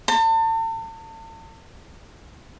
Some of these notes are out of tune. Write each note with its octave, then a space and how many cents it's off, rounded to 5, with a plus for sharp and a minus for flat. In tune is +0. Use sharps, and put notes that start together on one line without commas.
A5 +40